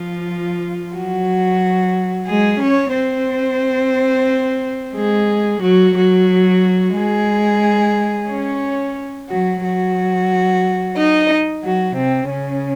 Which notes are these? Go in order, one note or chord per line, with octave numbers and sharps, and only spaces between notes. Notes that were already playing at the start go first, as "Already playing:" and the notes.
Already playing: F3 F4
F#3 F#4
G#3 G#4
C#4 C#5
C4 C5
G#3 G#4
F#3 F#4
F#3 F#4
G#3 G#4
C#4 C#5
F#3 F#4
F#3 F#4
D#4 D#5
F#3 F#4
C3 C4
C#3 C#4